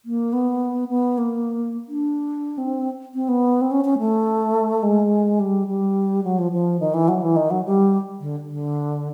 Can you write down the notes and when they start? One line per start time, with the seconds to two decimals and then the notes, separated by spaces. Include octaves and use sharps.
0.05 A#3
0.33 B3
0.89 B3
1.18 A#3
1.88 D4
2.58 C4
3.14 C4
3.28 B3
3.61 C4
3.71 C#4
3.85 C#4
3.98 A3
4.83 G#3
5.40 G3
5.67 G3
6.23 F#3
6.38 F3
6.52 F3
6.80 D#3
6.94 E3
7.08 F#3
7.22 E3
7.36 D#3
7.50 F#3
7.65 G3
8.20 D3
8.49 D3